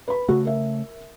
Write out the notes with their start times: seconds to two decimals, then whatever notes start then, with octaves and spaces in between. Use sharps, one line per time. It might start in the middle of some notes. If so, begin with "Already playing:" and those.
0.08 B4 B5
0.29 C#3 A3 F#4
0.45 A#4 E5